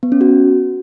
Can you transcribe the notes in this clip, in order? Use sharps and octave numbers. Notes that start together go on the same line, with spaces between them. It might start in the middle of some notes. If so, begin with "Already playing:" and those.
B3
C#4
F#4